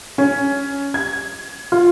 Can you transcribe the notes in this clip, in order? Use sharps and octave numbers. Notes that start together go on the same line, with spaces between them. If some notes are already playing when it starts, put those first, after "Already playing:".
C#4
G#6
F4